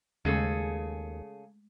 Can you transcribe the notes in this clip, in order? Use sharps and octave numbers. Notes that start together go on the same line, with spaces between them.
D#2 C#3 G#3 A3 G#4 A4